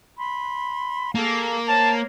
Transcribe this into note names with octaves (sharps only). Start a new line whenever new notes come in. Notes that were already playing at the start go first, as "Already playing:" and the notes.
B5 C6
A#3 G#4 A4 F5
A#4 C5 C#5 A5